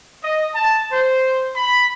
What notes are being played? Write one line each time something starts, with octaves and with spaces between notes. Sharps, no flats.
D#5
A5
C5
B5